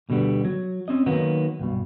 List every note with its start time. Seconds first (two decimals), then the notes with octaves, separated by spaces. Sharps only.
0.09 D2 B2 D3 G3 B3
0.45 F#3
0.88 C4 C#4 D#5
1.06 D#3 F#3 A#3 B3 D#4
1.59 B1 G2 B2